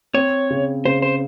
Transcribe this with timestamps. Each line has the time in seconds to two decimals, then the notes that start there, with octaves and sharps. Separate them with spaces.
0.14 C4 C#5
0.50 C#3
0.85 C#3 C5
1.02 C5